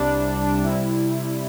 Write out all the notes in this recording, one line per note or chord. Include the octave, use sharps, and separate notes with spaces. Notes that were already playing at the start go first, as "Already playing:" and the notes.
Already playing: C2 C3 G3 D4
C3 G3 E4